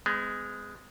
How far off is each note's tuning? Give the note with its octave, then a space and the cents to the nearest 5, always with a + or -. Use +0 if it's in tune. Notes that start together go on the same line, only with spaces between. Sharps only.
G#3 -5 B3 +45